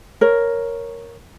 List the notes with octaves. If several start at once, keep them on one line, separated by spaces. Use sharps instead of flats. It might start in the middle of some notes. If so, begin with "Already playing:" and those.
A#4 C#5